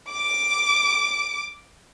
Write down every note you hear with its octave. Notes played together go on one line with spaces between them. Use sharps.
D6 D7